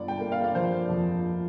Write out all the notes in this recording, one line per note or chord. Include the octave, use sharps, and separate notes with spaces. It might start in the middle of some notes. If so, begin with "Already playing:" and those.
Already playing: G1 D5
G5
A#3
F5
D5
F3 C5
F2